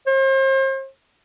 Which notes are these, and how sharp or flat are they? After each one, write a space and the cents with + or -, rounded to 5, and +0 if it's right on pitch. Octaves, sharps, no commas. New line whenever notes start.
C5 +40